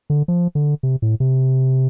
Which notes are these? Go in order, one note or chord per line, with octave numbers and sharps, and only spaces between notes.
D3
F3
D3
C3
A2
C3